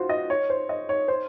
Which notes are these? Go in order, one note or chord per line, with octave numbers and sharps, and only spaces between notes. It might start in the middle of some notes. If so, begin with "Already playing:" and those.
Already playing: F4 F#4 C5
D#5
C#5
C5
D#5
C#5
C5